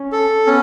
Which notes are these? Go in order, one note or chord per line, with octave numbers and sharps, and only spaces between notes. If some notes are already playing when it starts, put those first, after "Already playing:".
Already playing: C#4
A4
B3 C#4